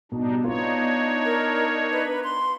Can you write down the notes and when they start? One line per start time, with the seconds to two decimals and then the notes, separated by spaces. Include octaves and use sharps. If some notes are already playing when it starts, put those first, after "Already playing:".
0.12 B2 G3 D4 D#4
0.44 B3 D4 D#4 F4 C#5
1.25 A#4
1.92 B4
2.24 C6